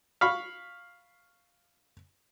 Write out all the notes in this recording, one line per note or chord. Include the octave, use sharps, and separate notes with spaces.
F5 B5 C#6